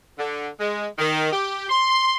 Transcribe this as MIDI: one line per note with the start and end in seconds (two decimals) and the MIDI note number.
0.18 0.48 50
0.59 0.86 56
0.98 1.31 51
1.32 1.65 67
1.69 2.16 84